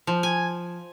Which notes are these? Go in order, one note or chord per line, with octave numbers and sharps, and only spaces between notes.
F3
G#5